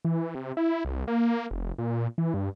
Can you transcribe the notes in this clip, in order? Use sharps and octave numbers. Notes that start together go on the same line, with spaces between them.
E3
C3
E4
C2
A#3
F1
A#2
E3
G2